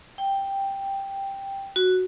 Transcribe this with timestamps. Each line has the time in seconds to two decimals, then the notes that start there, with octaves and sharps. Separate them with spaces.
0.18 G5
1.76 F#4